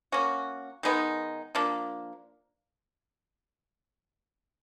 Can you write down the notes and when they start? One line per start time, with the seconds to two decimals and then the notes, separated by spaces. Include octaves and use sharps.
0.12 A#3 C#4 F#4
0.83 D#3 G#3 B3 D#4
1.55 F3 A#3 D4